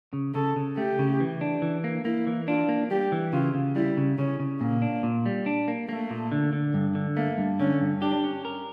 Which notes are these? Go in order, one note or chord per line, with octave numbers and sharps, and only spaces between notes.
C#3
C#3 A4
C#3
A3 G4
C#3
E3
D4
E3
A#3
A#3 E4
E3
D4 F4
A#3
G3 G4
E3
C#3 F4
C#3
G3 E4
C#3
C#3 C#4
C#3
A#2 A#3
D4
A#2
G3
D4
A#3
A3 A#3
A#2
D3
D3
G2
D3
A3 A#3
G2
D3 C#4
G2
D4 G4
C#4
A#4